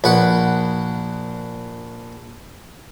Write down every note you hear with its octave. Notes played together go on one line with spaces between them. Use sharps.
A#1 B4 F#5